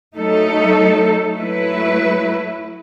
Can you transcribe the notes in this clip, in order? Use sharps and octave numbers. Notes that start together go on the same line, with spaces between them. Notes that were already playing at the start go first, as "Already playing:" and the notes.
F#3 A3 D#4 A4
F#3 A3 E4 B4